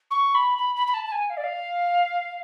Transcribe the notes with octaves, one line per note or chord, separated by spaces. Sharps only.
C#6
B5
B5
B5
B5
A5
A5
G#5
F5
D5
F5